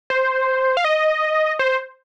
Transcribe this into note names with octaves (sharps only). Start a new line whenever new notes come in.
C5
F5
D#5
C5